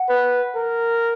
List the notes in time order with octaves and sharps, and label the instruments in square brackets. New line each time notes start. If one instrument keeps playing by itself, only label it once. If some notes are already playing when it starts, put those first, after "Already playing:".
Already playing: [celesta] F#5
[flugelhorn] B4
A#4